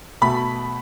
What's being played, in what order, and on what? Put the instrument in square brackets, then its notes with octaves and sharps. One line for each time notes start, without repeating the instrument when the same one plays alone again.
[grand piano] B2 A3 B5